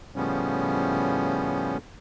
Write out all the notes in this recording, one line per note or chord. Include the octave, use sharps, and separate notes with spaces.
A2 C#3 F3 G3 B3 C#4